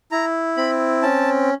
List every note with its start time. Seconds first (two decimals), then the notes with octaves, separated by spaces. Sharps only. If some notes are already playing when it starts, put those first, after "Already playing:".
0.12 E4 A#5
0.57 C4 B5
1.02 C#4 A5